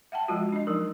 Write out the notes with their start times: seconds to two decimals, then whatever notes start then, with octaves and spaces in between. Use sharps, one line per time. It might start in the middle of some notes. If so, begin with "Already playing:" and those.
0.12 E5 F#5 G5 A5
0.28 F3 G#3 F4 F#4
0.52 D4 D#5
0.67 F3 F#3 D#4 A#4